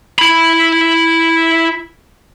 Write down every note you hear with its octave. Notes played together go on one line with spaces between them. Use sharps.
E4 B5